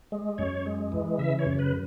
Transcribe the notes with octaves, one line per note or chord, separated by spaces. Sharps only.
G#3
F#2 C#5
G#3
E3
C#3 E5
C#5
F#2
B4